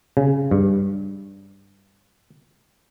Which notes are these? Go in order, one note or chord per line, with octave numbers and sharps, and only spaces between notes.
C#3
G2